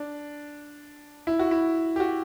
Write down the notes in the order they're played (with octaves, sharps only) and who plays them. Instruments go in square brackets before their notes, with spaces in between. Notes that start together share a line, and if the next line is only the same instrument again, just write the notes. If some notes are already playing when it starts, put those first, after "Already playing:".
Already playing: [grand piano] D4
E4
F#4
E4
G4
F#4